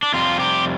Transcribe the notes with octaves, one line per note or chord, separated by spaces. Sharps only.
D4
F2 C3 G3 C4 F4
G4